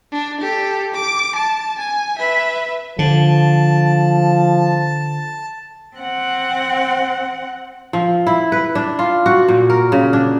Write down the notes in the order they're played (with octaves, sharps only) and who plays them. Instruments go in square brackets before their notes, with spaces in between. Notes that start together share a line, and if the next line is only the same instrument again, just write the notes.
[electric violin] D4
G4 A4
D6
A5
G#5
B4 E5
[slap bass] D3 [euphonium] F3 [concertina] A5
[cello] C4 F#5
[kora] F3
E4
B4
D4
F4
F#4
A#2
A#4
C#3
D4